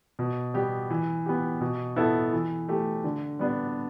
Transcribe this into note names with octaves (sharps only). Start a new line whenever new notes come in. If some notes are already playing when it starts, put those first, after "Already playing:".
B2
G3 B3 G4
E3
B3 G4
B2
B3 E4 A4
E3
A3 G4
D3
G3 B3 D4